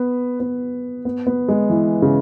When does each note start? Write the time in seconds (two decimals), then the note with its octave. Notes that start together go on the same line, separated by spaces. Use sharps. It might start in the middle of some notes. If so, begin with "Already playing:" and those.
Already playing: B3
0.40 B3
1.05 B3
1.27 B3
1.48 G#3
1.70 E3
2.02 C#3